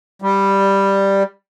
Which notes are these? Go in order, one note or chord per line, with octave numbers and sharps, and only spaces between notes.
G3